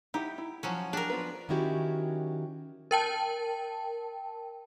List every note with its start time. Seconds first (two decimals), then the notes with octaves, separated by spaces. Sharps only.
0.14 D#4 E4 G4 F#5
0.38 E4
0.63 F3 F#3 C#4
0.93 D4 G4 G#4 A#4
1.10 F3 B3 B4
1.49 D#3 F#3 C#4 E4 F#4 G4
2.91 A#4 G5 A5